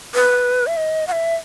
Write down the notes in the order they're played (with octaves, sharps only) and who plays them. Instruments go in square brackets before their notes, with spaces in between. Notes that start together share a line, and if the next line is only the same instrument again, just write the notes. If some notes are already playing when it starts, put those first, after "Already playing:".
[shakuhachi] B4
E5
D#5
F#5
E5